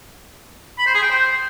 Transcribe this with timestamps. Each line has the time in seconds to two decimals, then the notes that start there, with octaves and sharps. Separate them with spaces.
0.78 B5
0.86 C5
0.94 G#4
1.02 G5
1.10 C5